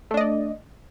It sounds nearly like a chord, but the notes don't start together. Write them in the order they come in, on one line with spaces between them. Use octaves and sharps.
A3 D4 D#5 D5